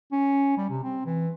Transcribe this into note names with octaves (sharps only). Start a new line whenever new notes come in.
C#4
G3
C3
C4
E3